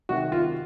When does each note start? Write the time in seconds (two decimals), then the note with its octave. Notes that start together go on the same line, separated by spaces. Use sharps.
0.09 C3 D#3 F#4
0.32 F4